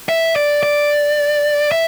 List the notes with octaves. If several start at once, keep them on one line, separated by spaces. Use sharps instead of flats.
E5
D5
D5
E5